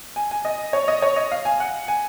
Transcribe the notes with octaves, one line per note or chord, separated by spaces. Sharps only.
G#5
G#5
D#5
C#5
D#5
C#5
D#5
F5
G#5
F#5
G#5